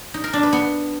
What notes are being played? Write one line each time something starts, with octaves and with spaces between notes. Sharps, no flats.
D#4
A#4
D4
B4
B3